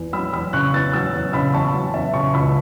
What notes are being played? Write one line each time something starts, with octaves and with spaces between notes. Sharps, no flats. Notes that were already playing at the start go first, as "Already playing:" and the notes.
Already playing: E2
F#3 B5 E6
E2 B5 E6
C#3 C#6 F#6
E2 E6 A6
F#3 E6 A6
E2
C#3 B5 E6
E2 A5 C#6
F#3
E2 E5 A5
C#3 A5 C#6
C#2 B5 E6